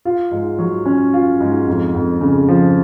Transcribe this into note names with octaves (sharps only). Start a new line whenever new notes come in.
F4
G#2
F#3
C#4
F4
G#2
F2
F2
C#3
F3